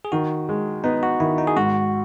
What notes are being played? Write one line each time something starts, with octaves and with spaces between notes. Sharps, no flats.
G#4
D#3 F#4
G#3
B3 D#4
F#4
D#3 E4
D#4
G#4
G#2 F#4